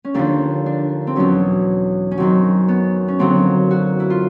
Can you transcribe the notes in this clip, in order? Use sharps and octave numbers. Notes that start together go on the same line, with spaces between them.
C#4
D#2 D3 F3 D4
D4
C4
E2 B2 F#3 C#4
C#4
F#2 D#3 F#3 C4
B3
C#4
D#2 D3 F#3 C4
F#4
E4
F4